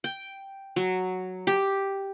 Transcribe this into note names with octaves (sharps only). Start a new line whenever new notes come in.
G5
F#3
G4